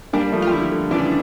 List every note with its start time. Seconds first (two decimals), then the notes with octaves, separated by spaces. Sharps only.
0.13 G3 A#3 D4
0.32 F3 A3
0.42 F4
0.47 G3
0.52 D3 F3 E4
0.71 D3
0.91 C#3 E3 D4